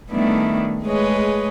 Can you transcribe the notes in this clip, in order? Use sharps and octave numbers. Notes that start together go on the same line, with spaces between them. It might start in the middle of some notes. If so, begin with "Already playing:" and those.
D#3 G3 A3 B3 D4 E4
G#3 A3 G#4 B4 C#5 D#5